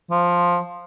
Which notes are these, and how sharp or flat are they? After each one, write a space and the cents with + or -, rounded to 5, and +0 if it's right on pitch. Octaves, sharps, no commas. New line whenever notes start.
F3 +5